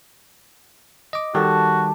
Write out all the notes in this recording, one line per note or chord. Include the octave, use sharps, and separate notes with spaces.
D#5 D6
D#3 G3 F#4 G4 A4 A5